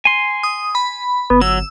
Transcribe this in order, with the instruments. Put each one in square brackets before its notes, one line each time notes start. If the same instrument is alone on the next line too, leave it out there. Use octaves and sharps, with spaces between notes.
[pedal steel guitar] G#5 C6
[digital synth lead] D#6
B5
[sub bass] G1 [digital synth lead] B3
[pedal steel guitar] F#3 [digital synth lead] E6